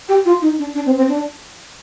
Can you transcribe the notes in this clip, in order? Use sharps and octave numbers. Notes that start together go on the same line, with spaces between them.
G4
F4
D#4
D4
D4
C4
C4
D4